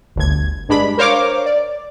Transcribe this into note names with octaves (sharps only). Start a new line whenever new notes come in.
G1 D2 G#6
G2 G#3 D4 B5
A#4 C5 C#5 F5 D6
D5